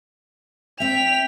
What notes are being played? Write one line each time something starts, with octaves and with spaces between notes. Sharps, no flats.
C4 E5 G5 B6 F7